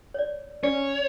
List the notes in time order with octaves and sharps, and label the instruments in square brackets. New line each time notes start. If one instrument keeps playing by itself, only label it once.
[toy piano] C#5 D5
[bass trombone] C#4 [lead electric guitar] C#5 [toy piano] D5